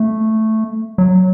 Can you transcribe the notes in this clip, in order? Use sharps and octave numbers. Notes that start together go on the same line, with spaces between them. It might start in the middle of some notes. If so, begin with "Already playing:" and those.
Already playing: A3
F#3